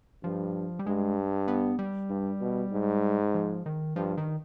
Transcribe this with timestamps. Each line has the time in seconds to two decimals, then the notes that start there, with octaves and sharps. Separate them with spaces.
0.23 G2 F3
0.79 G3
0.86 G2 G#3
1.48 B3
1.79 G3
2.10 G2
2.41 B2
2.72 G#2
3.34 F3
3.66 D#3
3.96 G2 F3
4.17 D#3